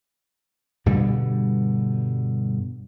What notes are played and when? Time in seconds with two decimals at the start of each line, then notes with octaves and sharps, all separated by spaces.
0.86 G2 B2 D3 G3